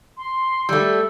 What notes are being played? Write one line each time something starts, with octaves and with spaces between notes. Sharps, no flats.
C6
G3 A3 E6